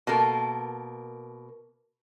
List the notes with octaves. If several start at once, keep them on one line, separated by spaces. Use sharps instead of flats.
B2 A#3 A4 A#4